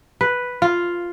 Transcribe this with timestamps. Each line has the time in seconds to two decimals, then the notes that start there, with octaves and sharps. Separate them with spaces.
0.21 B4
0.62 F4